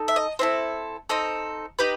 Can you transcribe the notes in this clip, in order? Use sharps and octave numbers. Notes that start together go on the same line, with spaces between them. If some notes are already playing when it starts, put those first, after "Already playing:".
Already playing: D#4 A4
E5
D#5
C4 E4 A4 C5
C4 D#4 A4
D#4 G4 B4